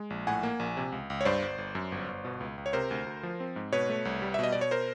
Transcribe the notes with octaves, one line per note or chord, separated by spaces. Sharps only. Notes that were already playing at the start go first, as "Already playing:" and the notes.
Already playing: G#3
A#1
A2 F#5 G#5
A#3
A#1
C3
C#2
C#2
C#5
G2 C5 D5
G1
G1
F#2
G1
G1
B2
C#2
C#2
C#5
C3 A#4 C5
D2
D2
F3
C4
G#2
B2 B4 C#5
A3
C2
G3
E5
B2 D#5
B2 D5
C#5
A#4 C5